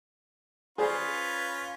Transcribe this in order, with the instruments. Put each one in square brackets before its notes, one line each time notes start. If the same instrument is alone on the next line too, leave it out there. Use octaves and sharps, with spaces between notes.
[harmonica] C#4 F4 B4 [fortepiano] G#4 C5 D5